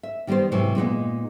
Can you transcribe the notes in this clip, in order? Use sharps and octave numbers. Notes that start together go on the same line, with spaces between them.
E5
D#3 G3 B3 G4 C5
G#2 C3 E3 F#3
A#2 G#3 B3 D#4